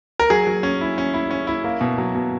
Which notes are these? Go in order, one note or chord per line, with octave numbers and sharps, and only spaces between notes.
A#4
F#3 G#4
F#3
C#4
E4
C#4
E4
C#4
E4
A#3
B2
F#3
B2